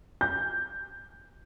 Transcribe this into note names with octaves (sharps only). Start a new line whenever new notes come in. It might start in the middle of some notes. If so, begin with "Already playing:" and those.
G6